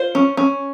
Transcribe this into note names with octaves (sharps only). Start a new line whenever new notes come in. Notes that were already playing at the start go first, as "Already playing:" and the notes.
Already playing: F4 C5
C#4
C#4